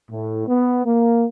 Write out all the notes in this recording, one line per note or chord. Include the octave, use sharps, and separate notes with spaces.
A2
B3
A#3